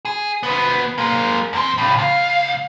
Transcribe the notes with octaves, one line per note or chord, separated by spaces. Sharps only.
G#4
D2 B3
G#3 A#3
E2 C4
A2 C#3
C#2 F5